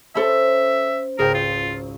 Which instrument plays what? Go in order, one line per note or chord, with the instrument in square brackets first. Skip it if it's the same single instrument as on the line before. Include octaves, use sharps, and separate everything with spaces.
[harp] C#4 C5 A6 [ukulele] A4 B5 [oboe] E5
[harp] G#1 C#2 [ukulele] G#4 C5 G5 [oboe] A#4
[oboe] F4